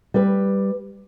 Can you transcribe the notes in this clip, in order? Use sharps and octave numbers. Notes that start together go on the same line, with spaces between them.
G3 B4